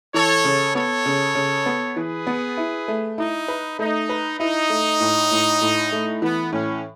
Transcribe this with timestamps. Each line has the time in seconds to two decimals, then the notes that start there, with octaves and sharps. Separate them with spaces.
0.14 E3 A4 C#5
0.44 C#3
0.75 B3 A4 C#5
1.06 C#3
1.35 C#3
1.66 B3
1.96 E3 G#4 B4
2.27 B3
2.57 E4
2.88 A3
3.18 D#4 E4
3.48 B4
3.79 A3 D#4
4.09 B4
4.39 D#4 E4
4.70 A3
5.01 A2
5.31 A2
5.61 A2
5.92 A3
6.22 E3 B3
6.52 A2 C#4